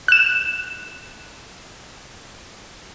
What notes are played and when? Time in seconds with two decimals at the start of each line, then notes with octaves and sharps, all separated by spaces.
0.08 F#6 E7